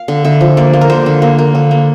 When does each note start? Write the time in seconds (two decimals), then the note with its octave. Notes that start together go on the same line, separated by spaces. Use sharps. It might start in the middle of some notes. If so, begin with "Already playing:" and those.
Already playing: F5
0.08 D3
0.25 D3 E5
0.41 F3
0.57 A#3 D5
0.73 A#3
0.81 A#4
0.90 D3 C5
1.06 D3
1.22 A#3
1.39 A#3
1.55 D3
1.71 A#3